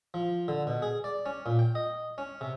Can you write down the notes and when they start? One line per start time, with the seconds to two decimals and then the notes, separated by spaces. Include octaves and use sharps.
0.14 F3
0.48 D3
0.67 B2
0.82 G#4
1.04 D5
1.26 C#4
1.46 A#2
1.59 G5
1.75 D#5
2.18 C#4
2.41 C3